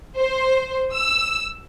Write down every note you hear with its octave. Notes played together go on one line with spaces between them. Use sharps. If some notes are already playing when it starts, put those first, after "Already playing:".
C5
E6